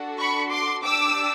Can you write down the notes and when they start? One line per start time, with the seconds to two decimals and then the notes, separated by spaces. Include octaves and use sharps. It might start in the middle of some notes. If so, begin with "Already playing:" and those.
Already playing: D4 F#4 A4
0.19 B5 C#6
0.51 C6 D6
0.83 D4 G4 D6 E6